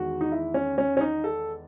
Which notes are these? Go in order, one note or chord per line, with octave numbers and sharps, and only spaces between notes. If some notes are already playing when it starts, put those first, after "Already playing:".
Already playing: E2 D#3 G#3 F#4
D#4
E4
C#4
C#4
C#4
D#4
A4